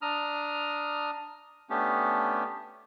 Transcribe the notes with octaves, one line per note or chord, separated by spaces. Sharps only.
D4 A#5 D#6 F6
A3 B3 C#4 D4 G4